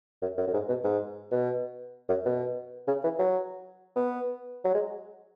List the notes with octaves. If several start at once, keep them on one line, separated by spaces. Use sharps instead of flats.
F#2
F#2
F#2
G#2
B2
G#2
B2
F#2
B2
C#3
E3
F#3
B3
F#3
G#3